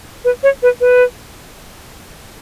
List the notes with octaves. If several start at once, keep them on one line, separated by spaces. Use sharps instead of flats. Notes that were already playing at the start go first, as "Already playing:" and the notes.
B4
C#5
B4
B4